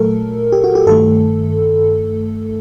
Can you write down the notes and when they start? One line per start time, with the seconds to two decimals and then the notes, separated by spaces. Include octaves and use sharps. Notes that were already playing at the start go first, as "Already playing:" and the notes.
Already playing: A#2 F#3 A3 A4 A#4
0.52 G4
0.64 F#4
0.75 G4
0.87 G2 D#3 A3 A4